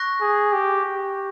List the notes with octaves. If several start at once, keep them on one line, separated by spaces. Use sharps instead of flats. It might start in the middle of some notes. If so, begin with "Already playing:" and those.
Already playing: C#6 F#6 A#6
G#4
G4
G4